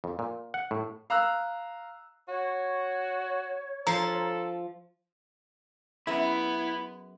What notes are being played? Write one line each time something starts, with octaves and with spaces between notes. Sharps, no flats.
F2
A#2
F#5
A2
F5 A#5 E6 F#6
F#4 C#5
F3 A4 A#5 C6
F#2 B3 E4 G#4 E5 B5